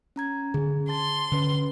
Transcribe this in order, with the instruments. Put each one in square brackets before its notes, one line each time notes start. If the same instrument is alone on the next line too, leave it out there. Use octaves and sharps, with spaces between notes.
[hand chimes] C#4 A#5 G#6
[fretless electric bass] D3 C#4 [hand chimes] G#4
[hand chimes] A5 A6 [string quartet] C6
[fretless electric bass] D3 [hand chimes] C#4 B4